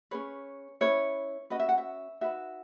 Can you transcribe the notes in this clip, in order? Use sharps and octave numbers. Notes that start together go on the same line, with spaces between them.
C#4 G#4 B4 C#5
C#4 E4 B4 C#5
C#4 F#4 B4 D#5
E5
F#5
E5
D#4 F#4 B4 E5